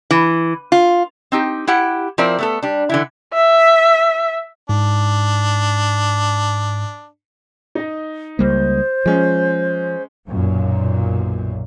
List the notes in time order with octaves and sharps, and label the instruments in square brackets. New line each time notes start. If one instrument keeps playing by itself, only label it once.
[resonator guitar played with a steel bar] E3
F4
C4 D#4 G4
E4 G4 F#5
F3 C4 E4 A#4 D5
A3 B3 A4
G3 D4
D3 E3 E4
[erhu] E5
[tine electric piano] G#2 [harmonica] D4
[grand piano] D#4 D#5
[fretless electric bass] C#2 G3 A#3 [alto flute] C5
[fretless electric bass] F3 [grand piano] G#3 C#4
[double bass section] B1 F#2 A#2